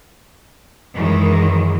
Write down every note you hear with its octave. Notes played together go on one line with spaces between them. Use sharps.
F#2 D#3 E3 G#3